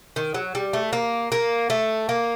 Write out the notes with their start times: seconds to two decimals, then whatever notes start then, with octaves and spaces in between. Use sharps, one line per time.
0.16 D#3
0.34 F#3
0.55 G3
0.73 A3
0.93 A#3
1.32 A#3
1.70 A3
2.09 A#3